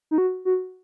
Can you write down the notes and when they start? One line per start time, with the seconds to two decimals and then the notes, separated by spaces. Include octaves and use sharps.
0.11 D#4
0.18 F#4
0.45 F#4